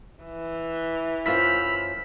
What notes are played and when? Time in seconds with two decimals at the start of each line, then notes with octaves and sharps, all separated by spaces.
0.25 E3
1.26 F#2 F4 C5 B5 E6 F6 B6